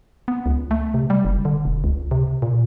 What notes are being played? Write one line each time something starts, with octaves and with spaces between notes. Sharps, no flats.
B3
C#2
A3
C3
G3
F#1
D3
E1
C#2
C3
A#2